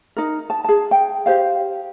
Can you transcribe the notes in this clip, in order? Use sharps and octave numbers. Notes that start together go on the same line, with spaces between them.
D#4 A#4
A5
G#4 A5
G5
G4 C5 F5